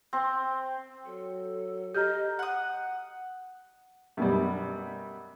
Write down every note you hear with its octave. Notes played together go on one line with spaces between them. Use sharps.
C4
F#3 A4
G4 D#5 A#5 F6 G6
F#5 D#6
F#2 B2 G3